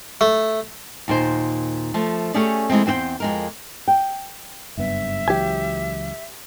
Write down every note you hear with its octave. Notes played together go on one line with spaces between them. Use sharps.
A3
D#2 A#2 C5
F3 A3
A3 C#4 G4 G#4 C#5 D5
E3 G#3 A3 C4
E2 C4 F#4 C5 G5
F2 G#3 A#4
G5
F#1 G2 B3 E5
C#2 E3 F#3 G4 G#5